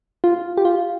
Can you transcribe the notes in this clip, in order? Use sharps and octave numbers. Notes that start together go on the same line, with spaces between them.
F4
G4
F4